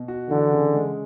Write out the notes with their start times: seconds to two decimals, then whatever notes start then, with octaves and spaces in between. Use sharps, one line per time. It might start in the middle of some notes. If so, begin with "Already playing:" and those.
Already playing: B2
0.08 F#4
0.30 D3 E3
0.51 C#3
0.73 G#3